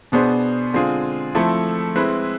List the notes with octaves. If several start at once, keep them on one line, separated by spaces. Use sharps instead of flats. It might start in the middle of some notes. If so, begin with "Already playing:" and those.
B2 B3 D4 G#4 C5
D3 G#3 C4 F4 G#4
F3 A3 C4 E4 A4
G#3 C4 E4 B4